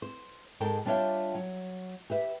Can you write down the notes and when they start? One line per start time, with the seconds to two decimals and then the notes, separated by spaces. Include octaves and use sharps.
0.02 C5
0.60 G#2 G#3 A4 A#4 G5 A5
0.85 G3 D4 F4 C#5 E5 G5
1.35 F#3
2.10 G4 B4 E5